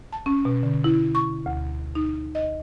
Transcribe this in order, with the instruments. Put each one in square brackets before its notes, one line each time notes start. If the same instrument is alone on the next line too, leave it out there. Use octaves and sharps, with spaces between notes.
[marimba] A5
C#4
B2
D3
E4
C#6
D2
D#4
D#5